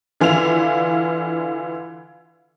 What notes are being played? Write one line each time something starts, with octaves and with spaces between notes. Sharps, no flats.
D3 E3 F4 F5 F7